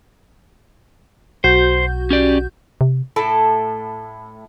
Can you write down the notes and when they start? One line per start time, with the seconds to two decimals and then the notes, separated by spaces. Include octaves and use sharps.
1.44 B1 F#4 C5 G6
2.10 C#4 G4 D5
2.81 C3
3.16 A2 E4 A4 A5